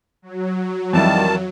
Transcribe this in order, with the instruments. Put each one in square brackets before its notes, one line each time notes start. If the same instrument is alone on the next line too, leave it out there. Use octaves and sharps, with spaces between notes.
[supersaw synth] F#3
[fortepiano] F2 E3 E4 [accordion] D#3 A5 [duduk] G3